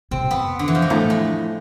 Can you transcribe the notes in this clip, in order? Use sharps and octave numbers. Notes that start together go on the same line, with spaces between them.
C3 C4
F2 B3
D3
E3
F3
G#3
A2 A3
G#3